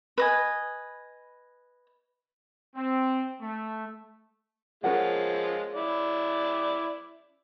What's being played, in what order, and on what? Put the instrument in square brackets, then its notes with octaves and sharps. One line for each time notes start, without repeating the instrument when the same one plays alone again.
[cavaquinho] B4 D#5 G#5
[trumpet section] C4
A3
[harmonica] F3 G#3 F4 [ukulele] C#4 A#4 F#5
[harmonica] E4 D5